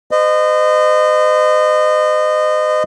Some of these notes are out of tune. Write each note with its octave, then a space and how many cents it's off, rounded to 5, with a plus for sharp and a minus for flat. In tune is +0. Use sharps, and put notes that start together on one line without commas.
C5 -45 D#5 -25